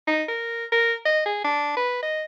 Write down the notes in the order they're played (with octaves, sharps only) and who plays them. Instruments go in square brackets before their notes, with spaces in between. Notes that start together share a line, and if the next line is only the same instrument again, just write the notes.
[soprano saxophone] D#4
A#4
A#4
D#5
G#4
D4
B4
D#5